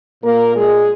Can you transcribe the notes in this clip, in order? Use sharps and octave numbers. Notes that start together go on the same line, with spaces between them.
A#2 A#3 A#4
G#3 G#4